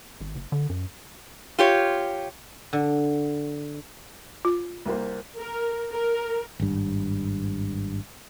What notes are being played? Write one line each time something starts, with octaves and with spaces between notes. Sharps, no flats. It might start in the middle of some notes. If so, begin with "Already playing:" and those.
G#1
F#1
D3
F#2
F4 G4 C#5
D3
F4
C2 A#3 C5
A#4
A#4
G#1 G2